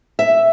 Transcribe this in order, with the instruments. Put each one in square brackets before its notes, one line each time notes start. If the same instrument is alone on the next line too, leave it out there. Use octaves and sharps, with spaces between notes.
[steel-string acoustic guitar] E5